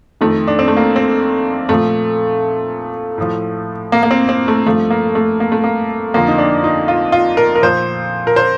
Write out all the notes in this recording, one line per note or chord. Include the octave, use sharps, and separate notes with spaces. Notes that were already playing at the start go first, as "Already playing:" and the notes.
F2 D#3 A3
D4
C4
A3
A#3
C4
A#2 F3 A3
A2 F3
A#3
A#3
C4
C4
A3
G2 F3 A3
A#3
A3
A#3
A3
A#3
F2 D3 F3 A#3
D#4
D4
D#4
F4
F4
A#4
A#4
A#2 F3 C5
A#4
C5